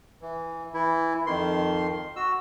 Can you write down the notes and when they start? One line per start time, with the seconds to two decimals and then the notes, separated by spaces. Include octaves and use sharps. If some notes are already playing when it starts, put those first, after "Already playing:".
0.21 E3
0.74 E3 E4
1.27 F2 D#3 C6
2.16 F#4 E6